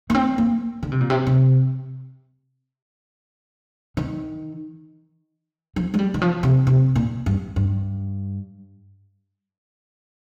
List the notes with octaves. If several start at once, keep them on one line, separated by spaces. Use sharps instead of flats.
A#3
C4
A#3
D3
C3
A#2
C3
C3
D#3
F3
G#3
G3
D#3
F3
C3
C3
A#2
G2
G2